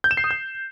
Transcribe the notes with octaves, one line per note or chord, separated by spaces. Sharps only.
G6
E7
C7
D#6
G6